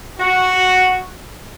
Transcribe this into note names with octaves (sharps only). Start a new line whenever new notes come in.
F#4